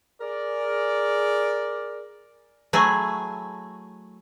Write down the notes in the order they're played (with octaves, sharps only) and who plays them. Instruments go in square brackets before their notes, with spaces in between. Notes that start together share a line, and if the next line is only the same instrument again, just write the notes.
[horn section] G#4 A#4 D5
[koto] F#3 A3 E4 G#4